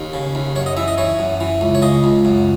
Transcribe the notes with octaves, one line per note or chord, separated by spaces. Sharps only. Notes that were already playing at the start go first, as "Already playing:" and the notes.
Already playing: D#2
C#3
D#2
F#2 C#5
D#5
E3 E5
D#5
E3 C#5
F#2
E3
C#2
C#5
C#3 D#5
C#2
F#2